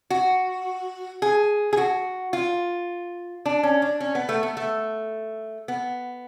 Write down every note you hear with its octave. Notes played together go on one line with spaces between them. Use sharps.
F#4
G#4
G#4
F#4
F4
D4
C#4
D4
C#4
B3
A3
B3
A3
B3